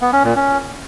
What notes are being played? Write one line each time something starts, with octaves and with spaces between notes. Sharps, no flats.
B3
C#4
A#2
C#4